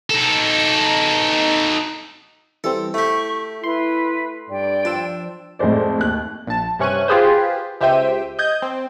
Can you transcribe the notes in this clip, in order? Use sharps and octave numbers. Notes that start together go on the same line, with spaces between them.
D#4 A4
E3 G3 C4 A4
A3 E4 G4 C#6
E4 B4 C6
G2 D5 G5
F3 D4 C5 E6
F2 A2 G#3 C5 D5
D#2 F#6
A#1 A5
G2 C3 C#4 C#6 F#6 D#7
F4 G4 G#4 B4 C5
C#2 G4 C5 E5 G5 D#7
D#5 G6 G#6
C4